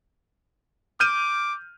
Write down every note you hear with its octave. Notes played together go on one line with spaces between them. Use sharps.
D6 F6 G6 D#7